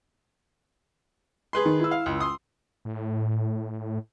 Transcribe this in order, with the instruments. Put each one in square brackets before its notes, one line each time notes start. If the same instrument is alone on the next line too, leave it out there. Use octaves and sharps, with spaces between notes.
[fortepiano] G#4 B4 C6
[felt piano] D#3
E4 E6
[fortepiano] F5
C#2
C6 D#6
[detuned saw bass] A2